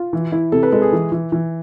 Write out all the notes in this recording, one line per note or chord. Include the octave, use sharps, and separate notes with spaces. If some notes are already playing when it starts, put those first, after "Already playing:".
Already playing: F4
E3
E4
C3 A4
B4
G#3 A4
G#4
E3
E3
E3